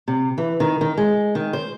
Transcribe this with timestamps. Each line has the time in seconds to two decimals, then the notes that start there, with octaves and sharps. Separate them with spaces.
0.08 C3
0.38 E3
0.60 D#3
0.81 D#3
0.98 G#3
1.35 D#3
1.53 C5